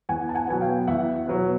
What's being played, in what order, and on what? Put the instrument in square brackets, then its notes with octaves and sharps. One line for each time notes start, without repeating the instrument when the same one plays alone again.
[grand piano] E2 F#5 G#5
A5
F#5 G#5
B2 F#3 B3 G#5
F5 G5
E2 E5 F#5
B2 F#3 B3